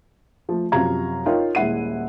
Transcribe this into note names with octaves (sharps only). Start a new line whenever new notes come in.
F3 A3
F#2 C3 F3 F5 A#5 G#6
D#4 F4 A#4 C#5 F5 G5
D#1 G#3 E4 F#5 C7 D#7